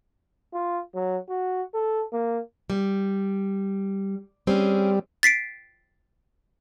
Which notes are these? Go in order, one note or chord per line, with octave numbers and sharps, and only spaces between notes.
F4
F#3
F#4
A4
A#3
G3
G3 C4 C#4 G#4
A6 B6 C7 D7